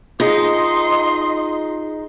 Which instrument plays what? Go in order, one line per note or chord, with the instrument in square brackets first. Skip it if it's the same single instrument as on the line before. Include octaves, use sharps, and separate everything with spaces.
[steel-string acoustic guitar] D#4 [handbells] F4 G#4 [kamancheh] D#5 C6